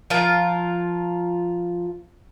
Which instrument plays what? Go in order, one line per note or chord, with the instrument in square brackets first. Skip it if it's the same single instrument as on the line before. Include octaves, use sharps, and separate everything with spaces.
[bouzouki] F3 F4 A#4